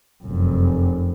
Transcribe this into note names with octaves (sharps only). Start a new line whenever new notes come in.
F1 F#2